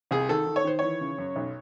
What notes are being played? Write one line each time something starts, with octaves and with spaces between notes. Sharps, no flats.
C2 G#4
D#3 A4
D#3
C#5
D#3 C5
E3 C#5
C#3
F#2
B1